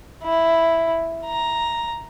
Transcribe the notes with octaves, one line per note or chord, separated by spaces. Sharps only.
E4
A#5